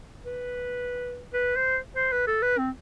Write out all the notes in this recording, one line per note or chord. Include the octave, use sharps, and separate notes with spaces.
B4
B4
C5
C5
B4
A4
B4
C4